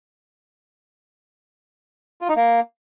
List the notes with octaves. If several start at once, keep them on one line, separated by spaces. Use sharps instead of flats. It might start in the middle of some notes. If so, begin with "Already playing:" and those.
F4
D#4
A#3